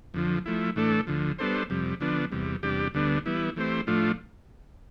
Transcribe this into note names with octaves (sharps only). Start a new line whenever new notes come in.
F2 D3 F3
F3 A3 E4
A2 E3 A3 D4 A4
D2 D3 F3
G3 B3 D4 A4 C5
F2 C3 G3
D3 F3 B3 D4
E2 C3 G3
E2 C3 G3 D4 G4
D2 D3 G3 B3 D4
E3 G3 B3 E4
E3 A3 C4 G4 C5
A2 F3 A3 D4 F4